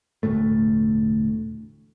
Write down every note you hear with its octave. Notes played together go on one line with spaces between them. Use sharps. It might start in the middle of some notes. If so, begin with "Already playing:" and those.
E1 D2 A2 A3